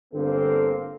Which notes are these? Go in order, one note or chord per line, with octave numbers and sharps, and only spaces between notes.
G1 D3 A#3 C4 A4